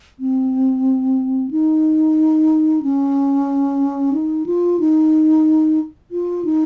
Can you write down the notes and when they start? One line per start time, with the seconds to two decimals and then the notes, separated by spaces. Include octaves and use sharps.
0.20 C4
1.51 D#4
2.83 C#4
4.13 D#4
4.46 F4
4.80 D#4
6.11 F4
6.45 D#4